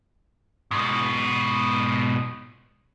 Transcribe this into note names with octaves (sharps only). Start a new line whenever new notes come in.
G#2 B2